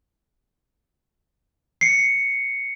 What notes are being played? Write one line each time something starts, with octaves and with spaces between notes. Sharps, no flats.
C7 C#7